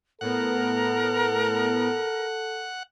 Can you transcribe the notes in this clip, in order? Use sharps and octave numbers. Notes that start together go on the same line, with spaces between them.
A2 B3 A4 A#4 F#5